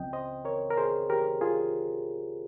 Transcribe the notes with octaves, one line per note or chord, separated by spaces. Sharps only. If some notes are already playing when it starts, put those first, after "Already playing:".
Already playing: C#2 C#3 F3 C4 D#5 G5
C5 D#5
A#4 C#5
A#4
G#4 C5
G4 A#4
F4 G#4